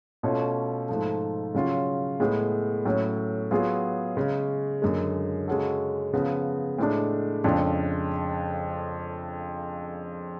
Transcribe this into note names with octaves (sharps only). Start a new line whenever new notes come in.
B2 A3 C#4 F4
G#2 F3 A3
C#3 F#3 C#4 F4
A2 G#3 B3
A2 F#3 C#4
F#3 B3 F4 G#4
C#3 G#3 C#4
F#2 D3 G#3
C#3 G#3 C#4 F#4 A4
C#3 F3 B3
A2 G#3 D4
F2 C#3 G#3 D4